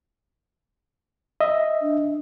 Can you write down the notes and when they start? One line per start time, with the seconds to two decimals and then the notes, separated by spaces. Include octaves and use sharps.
1.40 D#5 E5
1.81 D4